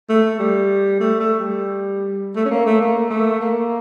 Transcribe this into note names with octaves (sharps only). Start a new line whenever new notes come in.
A3
G3
A3
A3
G3
A3
C#4
A#3
A3
A#3
A3
A#3